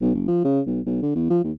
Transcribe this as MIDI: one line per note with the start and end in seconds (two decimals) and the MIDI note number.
0.01 0.12 35
0.15 0.24 30
0.28 0.42 53
0.45 0.60 49
0.66 0.81 35
0.86 0.99 35
1.02 1.11 50
1.15 1.25 40
1.30 1.39 53
1.44 1.52 39